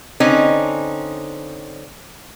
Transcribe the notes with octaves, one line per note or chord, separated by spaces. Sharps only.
D3 C4 C#4 D#4